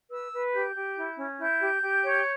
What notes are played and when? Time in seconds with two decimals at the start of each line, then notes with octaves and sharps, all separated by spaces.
0.11 B4 E6
0.32 B4
0.53 G4 G6
0.76 G4
0.97 E4
1.18 C#4
1.40 E4 G6
1.62 G4
1.82 G4
2.04 C#5